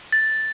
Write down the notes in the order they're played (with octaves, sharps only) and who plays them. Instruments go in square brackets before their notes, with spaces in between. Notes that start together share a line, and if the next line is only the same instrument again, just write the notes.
[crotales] A6